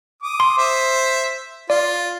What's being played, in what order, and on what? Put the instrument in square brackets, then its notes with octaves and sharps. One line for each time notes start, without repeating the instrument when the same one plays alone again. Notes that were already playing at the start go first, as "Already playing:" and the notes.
[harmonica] D6 D#6
[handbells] C6
[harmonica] C5 E5
[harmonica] F4 [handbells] D5